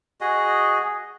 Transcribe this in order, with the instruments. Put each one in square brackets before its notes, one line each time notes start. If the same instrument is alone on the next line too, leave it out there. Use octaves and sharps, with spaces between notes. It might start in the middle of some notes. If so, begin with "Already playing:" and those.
[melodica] F#4 G#4 D#5